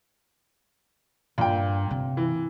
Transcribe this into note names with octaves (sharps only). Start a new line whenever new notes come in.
G2 A#2 G5
C3
E3